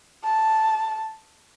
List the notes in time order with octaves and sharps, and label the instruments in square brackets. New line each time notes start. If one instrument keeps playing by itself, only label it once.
[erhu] A5